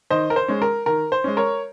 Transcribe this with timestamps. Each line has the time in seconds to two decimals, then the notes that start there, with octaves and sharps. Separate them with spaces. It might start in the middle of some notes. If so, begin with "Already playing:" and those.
0.10 D#3 C5 D#5
0.30 A#4
0.36 C5
0.48 G#3 C#4
0.62 A#4
0.86 D#3 A#4
1.12 C5
1.24 G#3 C#4
1.37 A#4 C#5